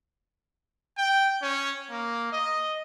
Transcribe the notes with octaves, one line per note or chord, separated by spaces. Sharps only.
G5
C#4
A#3
D#5